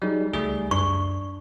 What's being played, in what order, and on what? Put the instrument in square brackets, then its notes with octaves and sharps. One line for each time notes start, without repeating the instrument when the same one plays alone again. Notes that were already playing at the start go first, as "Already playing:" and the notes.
[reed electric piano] F#3 D#4 G#4 [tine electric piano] G3
[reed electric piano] C#2 [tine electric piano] G3 A3 G#4
[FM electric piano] F#2 [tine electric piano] D4 [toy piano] C#6